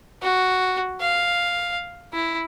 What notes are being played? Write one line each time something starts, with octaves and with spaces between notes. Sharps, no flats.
F#4
F5
E4